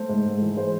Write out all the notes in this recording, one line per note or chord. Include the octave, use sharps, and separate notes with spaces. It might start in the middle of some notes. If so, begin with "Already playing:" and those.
Already playing: A3 C5
G#2
G#2
E3
G#3 C5